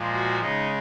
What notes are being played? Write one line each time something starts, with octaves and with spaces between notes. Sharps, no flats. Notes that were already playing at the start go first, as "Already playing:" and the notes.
Already playing: A#2 F3 G#3
F#4
C#3 G#3 D#4